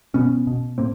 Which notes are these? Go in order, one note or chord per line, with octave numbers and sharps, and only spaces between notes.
B2 B3 C#4
B2
A2 A#3 C4